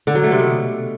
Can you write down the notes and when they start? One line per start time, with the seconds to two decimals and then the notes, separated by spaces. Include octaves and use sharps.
0.07 D3
0.15 F#3
0.23 A3
0.31 C3
0.39 B2